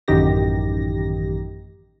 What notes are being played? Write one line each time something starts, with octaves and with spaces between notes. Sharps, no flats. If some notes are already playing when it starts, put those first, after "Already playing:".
A1 F#2 D#3 D#4 G4 A#6